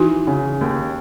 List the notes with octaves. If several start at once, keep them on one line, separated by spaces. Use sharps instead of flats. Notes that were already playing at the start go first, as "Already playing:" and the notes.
Already playing: E3 D#4 F#4
C#3
D#2